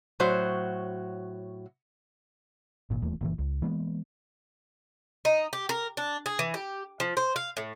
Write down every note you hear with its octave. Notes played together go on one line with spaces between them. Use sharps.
A2 F#3 F#4 C5
G#1 A#2
D#1 E2 A#2 A3
F#1 A#2 E3
C#2
E3 G#3 A#3 B3
D#4
G4
A#4
D4
G#4
E3
G4
F3
C5
F5
A2